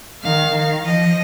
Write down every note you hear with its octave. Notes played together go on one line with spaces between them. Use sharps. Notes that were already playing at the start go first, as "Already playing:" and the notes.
D#3 F5
D#3
F3 D#5